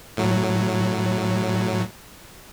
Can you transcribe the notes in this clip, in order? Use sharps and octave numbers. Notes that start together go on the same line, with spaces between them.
A2 F#3